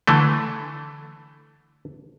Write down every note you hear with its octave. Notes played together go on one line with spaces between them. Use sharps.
D3 E3 A3